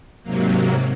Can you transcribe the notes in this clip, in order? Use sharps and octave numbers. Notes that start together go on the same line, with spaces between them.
G#2 C3 F#3 A#3